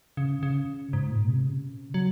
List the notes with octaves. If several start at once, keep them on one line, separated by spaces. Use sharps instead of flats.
C#3
C#3
G#2
A#2
C3
C#3
F#3